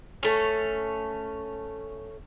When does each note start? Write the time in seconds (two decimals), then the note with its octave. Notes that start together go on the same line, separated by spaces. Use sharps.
0.23 A3 C#4